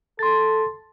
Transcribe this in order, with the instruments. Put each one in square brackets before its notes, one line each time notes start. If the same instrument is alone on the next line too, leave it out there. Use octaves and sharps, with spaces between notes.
[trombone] A4 [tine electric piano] C6 A6